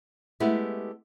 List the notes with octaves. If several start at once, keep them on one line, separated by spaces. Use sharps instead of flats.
G#3 A3 B3 E4 G4 G#4